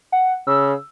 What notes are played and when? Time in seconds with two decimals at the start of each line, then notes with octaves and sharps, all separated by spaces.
0.12 F#5
0.47 C#3 E6